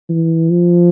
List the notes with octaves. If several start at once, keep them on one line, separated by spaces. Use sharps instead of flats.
E3
F3